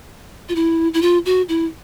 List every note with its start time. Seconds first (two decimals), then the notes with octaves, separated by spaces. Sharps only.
0.49 F4
0.55 E4
0.94 E4
1.02 F4
1.26 F#4
1.49 E4